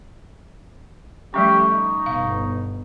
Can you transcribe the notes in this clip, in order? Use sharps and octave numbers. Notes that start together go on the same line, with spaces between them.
F3 G3 A3 C#4 G4 C#6
D#4
G1 B2 F5